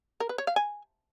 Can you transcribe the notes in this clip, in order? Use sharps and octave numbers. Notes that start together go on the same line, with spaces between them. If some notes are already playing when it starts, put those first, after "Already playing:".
A#4
B4
C#5
F5
G#5